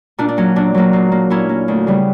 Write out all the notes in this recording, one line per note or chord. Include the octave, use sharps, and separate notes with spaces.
A#2 D4
D4
F#3 A#3 C#4
A#2 D4
F#3 A#3
A#2
A#3
A#2 C#4 E4
A#3
D2
C#3 G3 B3